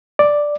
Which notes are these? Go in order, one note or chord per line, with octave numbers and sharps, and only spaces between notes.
D5